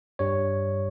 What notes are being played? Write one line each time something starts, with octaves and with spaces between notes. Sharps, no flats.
G2 G3 C#5